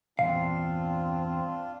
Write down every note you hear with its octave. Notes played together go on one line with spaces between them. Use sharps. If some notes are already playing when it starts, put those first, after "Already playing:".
E2 G2 A#2 C4 D4 F4 F5